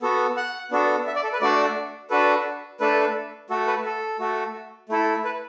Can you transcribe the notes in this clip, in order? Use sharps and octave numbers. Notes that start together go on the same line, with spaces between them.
B3 F#4 A4
F#5
B3 D4 F#4 A4
E5
D5
A4
B4
A3 D4 F#4 A4 D5
D4 F#4 A4 B4
A3 D4 A4 B4
A3 F#4 A4
B4
A4
A3 F#4 A4
A3 E4 A4
B4